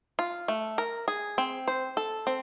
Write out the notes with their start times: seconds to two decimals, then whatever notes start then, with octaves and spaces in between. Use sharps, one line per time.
0.19 F4
0.48 A3
0.78 A#4
1.08 G#4
1.38 C4
1.68 C5
1.97 A4
2.27 C4